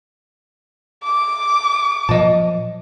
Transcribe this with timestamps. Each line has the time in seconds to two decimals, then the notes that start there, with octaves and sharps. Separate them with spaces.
1.04 D6
2.09 A#2 F3 F#3 D#5 A5